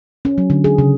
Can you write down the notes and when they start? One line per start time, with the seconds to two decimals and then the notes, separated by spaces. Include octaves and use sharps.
0.25 C#4
0.38 F#3
0.50 D3
0.64 G#4
0.78 C#3